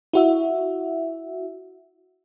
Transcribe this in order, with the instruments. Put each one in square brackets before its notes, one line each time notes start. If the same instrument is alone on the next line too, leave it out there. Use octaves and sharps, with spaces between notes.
[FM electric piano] E4 F#4 E5